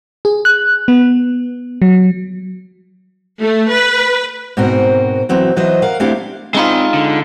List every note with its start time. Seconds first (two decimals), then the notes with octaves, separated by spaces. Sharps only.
0.25 G#4
0.45 F#6
0.88 B3
1.82 F#3
3.41 A3
3.70 B4
4.57 G#2 B2 C4 F#4 A#4
5.29 E3 F#3 C4 F#4
5.56 E3 F#3 F#4 C5 D#5 E5
5.82 A#4 F5 F#5
6.00 A3 C4 D4 E4 G4 F5
6.55 G#3 C4 D#4 F4 B5
6.94 D3